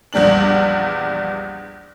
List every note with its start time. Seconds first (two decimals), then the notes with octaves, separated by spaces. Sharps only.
0.13 A#1 E2 G3 D4 F#7